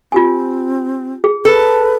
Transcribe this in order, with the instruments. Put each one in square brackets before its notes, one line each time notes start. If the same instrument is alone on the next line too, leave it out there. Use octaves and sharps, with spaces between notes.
[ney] C4 [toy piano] F4 G4 G#5
[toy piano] G#4
[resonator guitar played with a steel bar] A4 [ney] B4